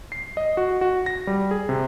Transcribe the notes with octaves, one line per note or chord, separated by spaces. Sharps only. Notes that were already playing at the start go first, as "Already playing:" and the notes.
C7
D#5
F#4
F#4
A#6
G3
G#4
C3